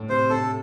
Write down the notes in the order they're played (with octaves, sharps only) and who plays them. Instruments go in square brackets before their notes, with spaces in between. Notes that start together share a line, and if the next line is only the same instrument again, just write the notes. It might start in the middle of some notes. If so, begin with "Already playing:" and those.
Already playing: [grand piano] A2
[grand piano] C3 [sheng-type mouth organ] C5
[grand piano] C3 [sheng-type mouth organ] A4